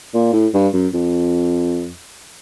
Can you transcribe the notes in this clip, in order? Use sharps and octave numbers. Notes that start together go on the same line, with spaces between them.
A#2
A2
G2
F#2
F2